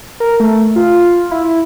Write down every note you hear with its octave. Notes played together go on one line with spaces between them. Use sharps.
A#4
A3
F4
E4